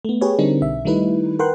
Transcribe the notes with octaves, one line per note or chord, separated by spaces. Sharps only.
A3 B3
G4 G#4 B4 C#5
D3 G3 C4 D4 D#4 A#4
B1 E5
D#3 G3 A3 D#4 E4 B4
A#4 B4 F#5 G5 C6 F#6